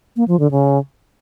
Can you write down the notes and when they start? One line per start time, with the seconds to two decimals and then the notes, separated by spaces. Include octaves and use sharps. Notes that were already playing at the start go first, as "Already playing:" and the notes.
0.16 A#3
0.28 F3
0.40 D3
0.51 C#3